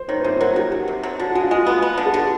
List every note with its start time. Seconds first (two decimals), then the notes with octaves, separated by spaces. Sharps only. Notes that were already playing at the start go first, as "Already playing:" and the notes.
Already playing: C5
0.08 D#3 C#5
0.18 B4
0.24 C3 C5
0.40 F#3 A#4
0.52 F#4
0.56 D#3 G4
0.72 F#3
0.88 C3
1.03 F#3
1.19 D3 F#4
1.35 G#3 F#4
1.43 F4
1.51 G#3 F#4
1.66 B3
1.82 B3
1.98 D3
2.05 G#4
2.14 D3 G4